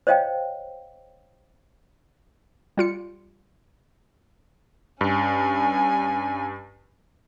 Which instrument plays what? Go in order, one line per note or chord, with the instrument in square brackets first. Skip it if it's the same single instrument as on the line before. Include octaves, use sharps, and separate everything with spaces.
[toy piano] C5 C#5 D#5 F5 G5
[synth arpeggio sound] G3 F4 C#7
[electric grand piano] G2 [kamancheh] C#4 G#5